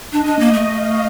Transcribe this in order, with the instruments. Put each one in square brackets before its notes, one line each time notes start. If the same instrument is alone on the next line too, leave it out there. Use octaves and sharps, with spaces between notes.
[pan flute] D4 [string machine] D#5
[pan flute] D4
A#3
A3
[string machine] F5